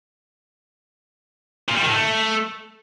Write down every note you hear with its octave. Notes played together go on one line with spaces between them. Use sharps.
A#2
G3
D#3
A2
A3